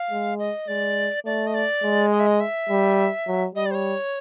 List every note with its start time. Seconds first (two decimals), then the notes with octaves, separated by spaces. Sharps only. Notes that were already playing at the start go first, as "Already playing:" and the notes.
Already playing: F5
0.11 G#3
0.39 D#5
0.68 G#3 D5
1.26 A3 D5
1.47 D#5
1.54 D5
1.83 G#3
2.12 D#5
2.20 E5
2.27 D#5
2.40 E5
2.70 G3
3.27 F#3
3.55 G3 D#5
3.66 D5
3.71 C5
3.75 C#5